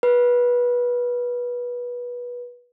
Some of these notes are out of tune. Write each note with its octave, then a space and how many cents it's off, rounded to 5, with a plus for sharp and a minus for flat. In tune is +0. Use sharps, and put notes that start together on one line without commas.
B4 -20